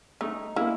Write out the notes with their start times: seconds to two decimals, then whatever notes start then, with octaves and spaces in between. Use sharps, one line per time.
0.21 A3 D#4
0.56 A#3 E4